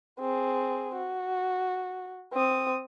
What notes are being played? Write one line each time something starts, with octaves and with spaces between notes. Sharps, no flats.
C4 G#4
F#4
C4 D#6